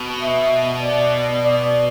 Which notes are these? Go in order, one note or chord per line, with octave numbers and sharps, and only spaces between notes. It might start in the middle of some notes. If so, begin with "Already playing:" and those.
Already playing: B2
E5
D5
D5